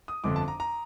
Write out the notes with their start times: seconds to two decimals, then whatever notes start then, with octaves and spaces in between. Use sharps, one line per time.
0.08 D#6
0.24 G1 F2 D3 D6
0.36 A5
0.48 A#5
0.60 A#5